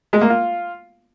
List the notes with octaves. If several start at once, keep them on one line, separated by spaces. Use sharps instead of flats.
G#3
A#3
F4